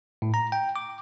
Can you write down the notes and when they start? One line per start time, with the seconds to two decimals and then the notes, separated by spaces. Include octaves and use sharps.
0.22 A2
0.34 A#5
0.52 G5
0.76 D6